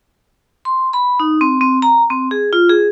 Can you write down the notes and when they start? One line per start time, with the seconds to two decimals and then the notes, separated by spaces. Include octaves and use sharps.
0.65 C6
0.93 B5
1.20 D#4
1.41 C4
1.61 C4
1.82 A#5
2.10 C4
2.31 G#4
2.53 F4
2.70 G#4